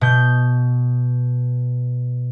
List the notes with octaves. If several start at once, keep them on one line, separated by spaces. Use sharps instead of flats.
B2 G6